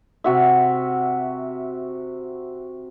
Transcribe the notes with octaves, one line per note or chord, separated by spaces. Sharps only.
C3 F#4 E5